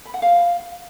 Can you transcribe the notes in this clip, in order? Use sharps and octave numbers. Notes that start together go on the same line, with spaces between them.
B5
F#5
F5